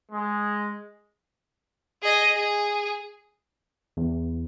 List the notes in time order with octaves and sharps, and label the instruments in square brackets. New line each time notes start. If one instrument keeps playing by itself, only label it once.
[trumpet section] G#3
[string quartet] G#4 D#5
G#4
[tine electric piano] E2